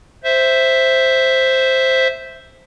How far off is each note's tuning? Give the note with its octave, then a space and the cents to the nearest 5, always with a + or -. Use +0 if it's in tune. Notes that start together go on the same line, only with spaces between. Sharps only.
C5 +0 E5 +0